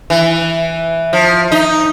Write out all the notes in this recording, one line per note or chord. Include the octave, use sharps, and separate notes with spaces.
E3
F3
D#4